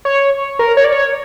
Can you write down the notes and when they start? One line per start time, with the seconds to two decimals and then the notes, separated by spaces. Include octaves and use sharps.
0.05 C#5
0.59 A#4
0.77 C#5
0.84 D5
0.92 C#5